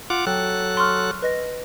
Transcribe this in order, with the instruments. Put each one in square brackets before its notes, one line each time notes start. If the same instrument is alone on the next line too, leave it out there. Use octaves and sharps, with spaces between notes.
[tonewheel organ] F4 F#5 D6
[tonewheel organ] F#3 A4 F#6 [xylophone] G5
[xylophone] C6 C#6 F6
B4 D#5 A#6